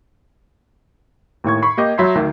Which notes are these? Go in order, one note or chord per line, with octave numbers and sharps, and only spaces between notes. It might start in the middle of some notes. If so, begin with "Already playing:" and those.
D#2 A2 C#6 G#6
B5 C#6 C7
A#3 G4 D#5 G6
F#3 E5 B5 C6 C7
D2 D#3